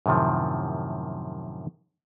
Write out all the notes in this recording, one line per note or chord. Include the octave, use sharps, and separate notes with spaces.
F#2 A2 C3 D#3 F3